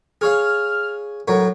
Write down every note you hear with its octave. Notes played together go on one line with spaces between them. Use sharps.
G#4 C#5 F5 F6
A2 F#3 A#4 C#5